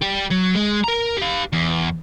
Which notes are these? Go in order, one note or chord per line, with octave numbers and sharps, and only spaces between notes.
G3 G4
F#3
G#3
A#4 A#5
G4 F5
E2